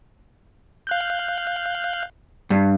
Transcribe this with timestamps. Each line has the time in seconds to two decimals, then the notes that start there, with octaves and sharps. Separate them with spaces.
0.87 F5 F#6 G6
2.50 G2